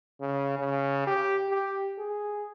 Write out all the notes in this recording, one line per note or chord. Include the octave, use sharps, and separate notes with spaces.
C#3
C#3
G4
G4
G#4